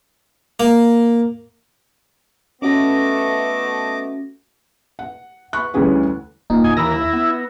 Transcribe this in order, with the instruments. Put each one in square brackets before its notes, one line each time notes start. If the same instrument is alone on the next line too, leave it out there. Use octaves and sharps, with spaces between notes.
[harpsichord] A#3
[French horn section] A3 B3 [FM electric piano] C#4 F#4 A#6 [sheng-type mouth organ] D#5 D6
[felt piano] F#5
B5 C#6 F#6
D2 E3 G3 C#4 G#4 B4
[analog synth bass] E1 [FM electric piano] A#2 D#4
[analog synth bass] D#2 [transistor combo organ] D#5 G#5
[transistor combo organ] E3 A#4 [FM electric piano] B5 E6 A#6
[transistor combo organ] E4
[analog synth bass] B3